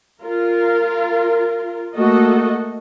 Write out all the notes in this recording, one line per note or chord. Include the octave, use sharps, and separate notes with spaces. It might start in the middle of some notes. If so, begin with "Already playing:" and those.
F4 A#4
A3 A#3 F#4 A4 D#5